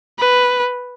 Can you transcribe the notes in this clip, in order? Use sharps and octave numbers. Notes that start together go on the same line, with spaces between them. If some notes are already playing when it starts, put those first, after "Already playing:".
B4